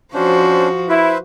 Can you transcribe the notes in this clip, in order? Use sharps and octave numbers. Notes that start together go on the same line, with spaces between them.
F3 C#4 D4 F#4 C5
E4 B4 C5 E5